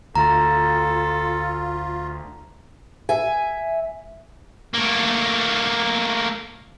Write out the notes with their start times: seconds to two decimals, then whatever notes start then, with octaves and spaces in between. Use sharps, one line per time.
0.15 D2 F4 A4 A#5
3.09 E5 G#5
4.75 A3 A#3